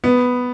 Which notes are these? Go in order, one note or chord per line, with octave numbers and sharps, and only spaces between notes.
B3